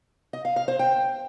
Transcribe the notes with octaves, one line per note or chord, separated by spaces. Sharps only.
D#5
F5
F5
C5
G5